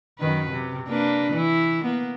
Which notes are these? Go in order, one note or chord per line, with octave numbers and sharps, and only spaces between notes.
F#2 D#3 B4
C3
A#3 D4 B4
E3 E4
A#3 B3